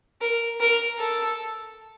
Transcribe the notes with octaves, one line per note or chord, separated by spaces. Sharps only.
A#4
A#4
A4